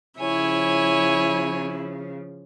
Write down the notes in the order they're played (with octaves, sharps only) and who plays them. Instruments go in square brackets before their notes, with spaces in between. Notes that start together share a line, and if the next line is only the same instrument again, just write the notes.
[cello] C#3 F3 [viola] E4 [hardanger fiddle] C#5 G#5